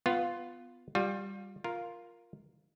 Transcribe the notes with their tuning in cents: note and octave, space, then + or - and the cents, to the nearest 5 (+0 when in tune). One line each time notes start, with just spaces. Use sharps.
B3 +15 F4 +0
G3 +5 F4 +30
F4 +0 A#4 +0